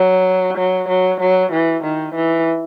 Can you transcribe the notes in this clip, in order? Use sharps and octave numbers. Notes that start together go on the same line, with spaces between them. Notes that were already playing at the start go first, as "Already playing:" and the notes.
Already playing: F#3
F#3
F#3
F#3
E3
D#3
E3